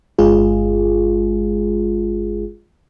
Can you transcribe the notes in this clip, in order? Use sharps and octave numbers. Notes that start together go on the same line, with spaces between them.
G1 G#3 F4 G#4